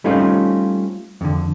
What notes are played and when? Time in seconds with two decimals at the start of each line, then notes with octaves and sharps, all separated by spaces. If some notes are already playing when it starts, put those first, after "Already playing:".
0.04 G3 A3 C4 C#4 D#4 F4
1.21 F2 D3